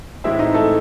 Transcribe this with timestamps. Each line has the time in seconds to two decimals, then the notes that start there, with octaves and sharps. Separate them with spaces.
0.24 A2 E3 G#3 C4 E4 E5
0.39 D#4 D#5
0.54 A3 A4